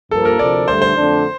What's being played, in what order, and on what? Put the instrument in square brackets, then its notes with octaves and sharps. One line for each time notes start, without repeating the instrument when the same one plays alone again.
[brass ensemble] G2 F3 A#3 [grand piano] A4
[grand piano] A#4
[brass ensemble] D2 C3 F3 [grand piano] D5
[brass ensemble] G2 D3 A3 [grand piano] C5
[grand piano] C5
[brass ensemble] F2 D3 A3 D4